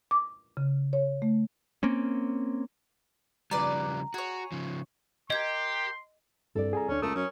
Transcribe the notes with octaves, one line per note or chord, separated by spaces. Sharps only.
D6
C#3
C#5
A3
A#3 C4 C#4
C#3 F3 G3 B4 D5 A#5
F#4 G#4 C#5
C#3 F3
G4 A#4 D#5 C6 G6 G#6
C2 G2 A4 D5
G#4 G#5 A#5
D2 C#4 D4
C#2 A3 A#4 D#6
F#2 C#4